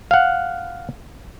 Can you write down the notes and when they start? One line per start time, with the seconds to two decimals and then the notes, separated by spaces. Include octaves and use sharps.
0.11 F5 F#5